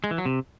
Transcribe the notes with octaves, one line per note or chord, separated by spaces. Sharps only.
G#3
E3
F#3
C3